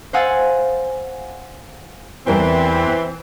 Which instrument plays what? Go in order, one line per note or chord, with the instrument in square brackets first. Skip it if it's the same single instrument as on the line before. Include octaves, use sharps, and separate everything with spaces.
[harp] C5 F5 F#5 G#5 E6 A6
[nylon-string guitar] E2 G3 A#4 [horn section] E3 C4